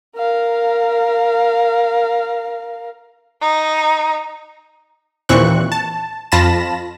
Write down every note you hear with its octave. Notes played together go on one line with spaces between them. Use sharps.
A#4 F5
D#4
D#2 A#2 E3 C4 C#6 F#6
A5
F2 F4 A5 B5 A#6 E7